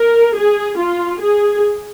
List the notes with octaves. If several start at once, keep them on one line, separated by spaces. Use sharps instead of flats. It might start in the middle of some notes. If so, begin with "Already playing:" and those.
Already playing: A#4
G#4
F4
G#4